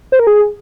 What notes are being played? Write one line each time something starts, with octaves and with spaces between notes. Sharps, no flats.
C5
A#4
G#4